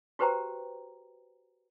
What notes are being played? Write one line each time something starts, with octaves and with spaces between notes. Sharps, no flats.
F#4 G4 B4 C5 G5 A#5